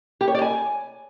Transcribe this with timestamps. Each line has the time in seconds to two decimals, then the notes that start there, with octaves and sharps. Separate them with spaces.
0.21 G4
0.28 C#5
0.35 D5
0.41 G#5